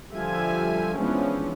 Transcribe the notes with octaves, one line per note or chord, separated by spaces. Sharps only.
D3 F3 G3 F4 E5 G#5
E3 F3 G#3 B3 C#4 D4